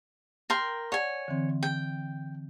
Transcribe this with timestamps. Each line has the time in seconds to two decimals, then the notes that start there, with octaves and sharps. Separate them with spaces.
0.50 A#4 G5 C6
0.92 C#5 D5 F#5 G#5
1.28 D3 E3 C4
1.63 G5